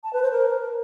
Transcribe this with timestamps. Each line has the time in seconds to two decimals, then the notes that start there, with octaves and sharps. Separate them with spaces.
0.03 A5
0.13 B4
0.22 C5
0.31 A#4